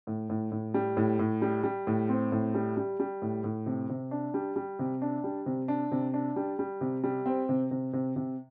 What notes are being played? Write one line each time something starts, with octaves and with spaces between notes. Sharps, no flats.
A2
A2
A2
G3
A2
A2
G3
G3
A2
C4
A2
G3
G3
G3
A2
A2
C3
C3
D4
G3
G3
C3
D4
G3
C3
D4
C3
D4
G3
G3
C3
G3
C4
C3
C3
C3
C3